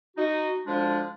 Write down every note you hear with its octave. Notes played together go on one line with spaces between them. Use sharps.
D#4 F#4
D2 F3 G#3 D4